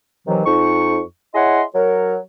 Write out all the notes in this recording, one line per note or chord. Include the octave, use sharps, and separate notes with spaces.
C3 D#3 E3 F#3
F2 D#4 C#6
E4 G#4 C#5 D#5 F#5 C6
F#3 A#4 C#5